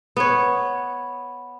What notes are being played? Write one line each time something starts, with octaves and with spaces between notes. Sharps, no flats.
B3 C#5